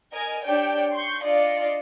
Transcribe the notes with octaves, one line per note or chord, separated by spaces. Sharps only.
A#4 D#5 G#5
D4 G4 C#5 D5 G5
C6 C#6 G6
D4 F4 D5 D#5 C#7